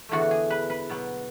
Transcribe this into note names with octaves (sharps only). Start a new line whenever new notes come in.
E2 D3 A3 E4 F#4
F#4
G#4
B4
B4
B2 F#3 B3